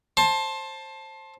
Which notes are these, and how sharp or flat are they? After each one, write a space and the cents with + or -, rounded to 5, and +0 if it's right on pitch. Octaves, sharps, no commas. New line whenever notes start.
C5 +25 A5 +0 C6 +25